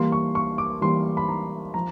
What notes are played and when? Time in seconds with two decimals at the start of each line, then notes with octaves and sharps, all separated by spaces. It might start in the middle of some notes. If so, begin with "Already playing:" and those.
Already playing: E3 G3 A#3 C6
0.12 C#6
0.35 C#6
0.58 D6
0.81 E3 G3 A#3 C6
1.17 B5
1.29 A#5
1.74 F3 A#5